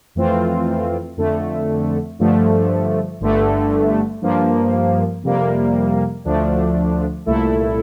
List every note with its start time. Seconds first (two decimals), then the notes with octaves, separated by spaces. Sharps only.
0.15 F2 E3 A3 C4 F4
1.17 F2 D3 A3
2.19 G2 D3 F3 A3
3.20 G1 G2 D3 A3
4.22 G2 F3 A#3
5.23 F2 C3 G3 A#3
6.25 D2 D3 F3 A3 D4
7.26 C2 A#2 A3 E4 A4